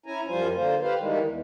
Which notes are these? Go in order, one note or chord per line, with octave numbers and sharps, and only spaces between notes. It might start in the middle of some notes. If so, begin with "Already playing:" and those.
C#4 E4 G#5 A#5
F#2 F3 G3 F4 C5 G#5
D3 A#3 F4 C5
G4 B4 C5 F5
D#3 E3 G3 G#3 A#3
E2